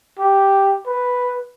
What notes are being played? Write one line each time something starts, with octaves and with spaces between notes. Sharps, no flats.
G4
B4